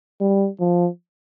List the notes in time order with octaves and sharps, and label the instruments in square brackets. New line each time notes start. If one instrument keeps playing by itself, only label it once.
[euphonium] G3
F3